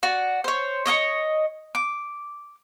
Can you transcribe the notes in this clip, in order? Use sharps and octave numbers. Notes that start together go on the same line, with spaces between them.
F#4 D5
C5 C#5
C#5 D#5 E5 C#6
D6